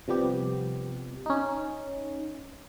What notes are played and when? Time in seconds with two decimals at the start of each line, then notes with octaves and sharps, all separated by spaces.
0.08 C3 F3 G3 B3 G4
1.26 C#4 D#4